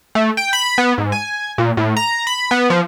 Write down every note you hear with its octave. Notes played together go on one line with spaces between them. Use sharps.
A3
G5
B5
B3
G#2
G#5
A#2
A2
A#5
B5
B3
F3